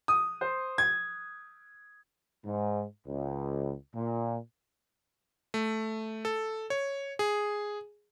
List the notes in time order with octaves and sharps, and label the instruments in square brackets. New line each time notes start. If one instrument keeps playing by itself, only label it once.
[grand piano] D#6
C5
G#6
[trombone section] G#2
C#2
A#2
[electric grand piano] A3
A4
C#5
G#4